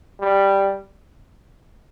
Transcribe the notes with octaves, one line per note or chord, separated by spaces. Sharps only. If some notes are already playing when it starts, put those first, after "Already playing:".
G3